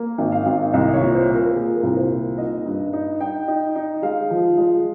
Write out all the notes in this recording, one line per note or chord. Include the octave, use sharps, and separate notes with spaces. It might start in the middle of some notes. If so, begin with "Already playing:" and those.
Already playing: A#3
G#1
F5
G#1
C2 D#5
C#5
A#2
C5
A#2
A#4
A#4
A#2 G#4
A#4
C2
C5
A#2
D#4 D#5
G2
D#4
D#4 G5
D#4
D#4
G#3 F5
F3
G#3